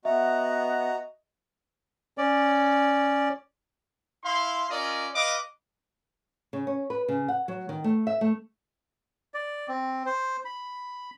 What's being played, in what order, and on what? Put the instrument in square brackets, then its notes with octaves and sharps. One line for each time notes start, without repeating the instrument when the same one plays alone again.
[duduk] B3 [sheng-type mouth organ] F#4 A#5 [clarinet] D#5 [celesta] E5
[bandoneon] C#4 D5
[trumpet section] E4 F5 C6
C#4 F4 A#4 D5 D#5
B4 D#5 F5 D6
[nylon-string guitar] C#3
C#4
B4
C#3
F#5
F#3
D#3
A3
E5
A3
[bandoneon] D5
C4
C5
B5